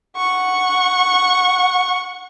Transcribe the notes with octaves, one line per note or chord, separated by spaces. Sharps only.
F#5 C#6